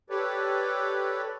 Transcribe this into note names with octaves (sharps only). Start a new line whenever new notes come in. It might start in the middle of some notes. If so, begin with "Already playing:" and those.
G4 A4 B4 C#5 D5